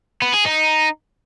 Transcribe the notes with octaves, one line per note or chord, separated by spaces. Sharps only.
B3
G#4
D#4